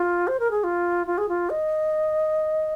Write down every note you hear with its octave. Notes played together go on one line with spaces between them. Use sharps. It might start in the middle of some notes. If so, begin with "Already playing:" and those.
Already playing: F4
C5
A#4
G#4
F4
F4
G#4
F4
D#5